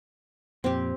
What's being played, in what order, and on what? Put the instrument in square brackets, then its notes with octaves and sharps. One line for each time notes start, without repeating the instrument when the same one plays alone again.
[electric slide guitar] F2 A#2 [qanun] C4 G4